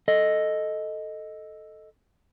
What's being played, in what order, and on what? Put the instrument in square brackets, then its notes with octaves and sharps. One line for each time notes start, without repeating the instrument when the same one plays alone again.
[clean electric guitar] A4 D#5